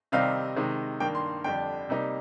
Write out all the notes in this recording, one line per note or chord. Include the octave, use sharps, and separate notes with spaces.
C3 D#3 G3 C4 D#4 F5
C3 D#3 G#3 D#4
G2 D#3 A#3 G5
C6
F2 D3 G3 D4 G5
C3 G3 A#3 D#4